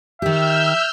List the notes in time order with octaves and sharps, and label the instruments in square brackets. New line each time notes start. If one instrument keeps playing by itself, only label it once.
[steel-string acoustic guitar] D#3 G4 [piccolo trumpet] E5 [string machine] E6 F6 G6